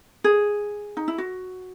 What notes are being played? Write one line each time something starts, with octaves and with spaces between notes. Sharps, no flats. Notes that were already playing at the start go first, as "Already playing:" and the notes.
G#4
D#4
E4
F#4